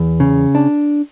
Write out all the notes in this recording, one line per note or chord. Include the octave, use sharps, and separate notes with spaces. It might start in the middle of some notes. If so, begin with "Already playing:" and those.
Already playing: E2
C#3
D4